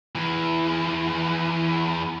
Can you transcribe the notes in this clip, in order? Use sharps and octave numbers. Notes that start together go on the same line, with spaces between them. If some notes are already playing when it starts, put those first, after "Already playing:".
E2 E3